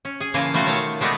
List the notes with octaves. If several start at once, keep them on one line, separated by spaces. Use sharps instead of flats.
C#4
G#4 G#5
C#3 E3 A#3 F4 G#5 A5
B2 G3 A3 F4 F#4
D#3 A3 C#5 A5
B2 G#3 A3 B3 D#4 D5